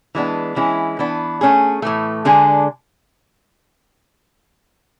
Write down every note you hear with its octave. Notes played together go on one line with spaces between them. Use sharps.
E3 G#3 B3 D4
E3 G#3 C#4 E4
E3 B3 D4
A3 C#4 G#4
A2 E3 A3
D3 G#3 D4 G#4